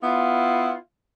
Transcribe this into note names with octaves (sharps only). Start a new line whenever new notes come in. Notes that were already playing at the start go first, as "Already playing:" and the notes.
B3 E4 F4